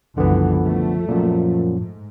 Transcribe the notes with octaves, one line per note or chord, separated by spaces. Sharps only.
F#1 C2 D3 E3 F3 B3
A3
F#2 A#2 F3
G#2